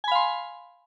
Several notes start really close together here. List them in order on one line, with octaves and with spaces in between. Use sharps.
G#5 B5 F5 C6